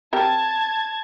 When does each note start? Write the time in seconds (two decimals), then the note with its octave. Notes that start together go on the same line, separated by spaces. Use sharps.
0.13 C4 G4 A#4 A5 G#6